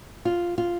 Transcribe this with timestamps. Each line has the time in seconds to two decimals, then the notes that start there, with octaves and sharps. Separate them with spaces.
0.25 F4
0.58 F4